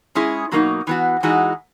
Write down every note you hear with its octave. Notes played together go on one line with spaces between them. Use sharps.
G#3 C#4 E4 G#4
B2 F#3 A#3 D#4
E3 B3 F#4
E3 G#3 D#4 F#4